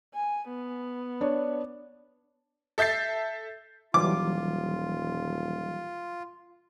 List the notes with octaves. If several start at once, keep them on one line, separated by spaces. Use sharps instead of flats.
G#5
B3
D4 C#5
A4 E5 G6 A6 C7
D#1 E3 F#3 G3 F4 D6